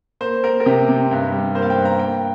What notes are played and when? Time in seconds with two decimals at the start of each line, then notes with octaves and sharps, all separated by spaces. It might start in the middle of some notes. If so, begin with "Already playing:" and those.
0.21 A#3 C5
0.44 A#3 A#4
0.60 A#4
0.66 C3 G4
0.89 C3
1.11 G2
1.32 G3
1.55 A#3 C5
1.62 F5
1.70 G5
1.78 G2
1.85 A#5
1.99 A#3 G5